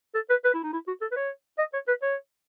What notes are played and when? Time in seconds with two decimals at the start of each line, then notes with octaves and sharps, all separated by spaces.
0.15 A4
0.30 B4
0.45 B4
0.54 E4
0.63 D#4
0.73 E4
0.88 F#4
1.01 A4
1.12 B4
1.17 C#5
1.59 D#5
1.74 C#5
1.88 B4
2.02 C#5